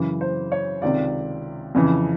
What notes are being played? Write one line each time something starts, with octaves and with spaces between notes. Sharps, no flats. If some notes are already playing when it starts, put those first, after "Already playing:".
Already playing: F#2 C#3 E3
C5
C#5
C#2 C3 D#3 D5
F2 C#3 E3